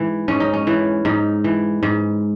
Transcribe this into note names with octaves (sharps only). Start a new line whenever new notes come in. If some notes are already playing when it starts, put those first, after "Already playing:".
Already playing: G#2 E3
G#2 C#4
D#4
C#4
E3
G#2 D#4
E3
G#2